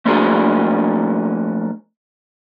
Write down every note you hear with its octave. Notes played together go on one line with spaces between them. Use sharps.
F3 A3 A#3 D4 F#4 G#4